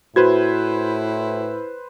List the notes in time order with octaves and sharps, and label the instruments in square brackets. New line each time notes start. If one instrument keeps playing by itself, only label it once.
[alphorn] A2 [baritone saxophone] E4 [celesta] F#4 [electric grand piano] B4 C5 G#6